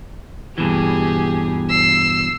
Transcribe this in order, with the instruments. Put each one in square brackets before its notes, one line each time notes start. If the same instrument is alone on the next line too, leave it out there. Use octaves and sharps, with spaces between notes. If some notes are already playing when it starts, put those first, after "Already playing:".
[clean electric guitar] G2 B2 E3 [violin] G4 G#4
[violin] E6 C7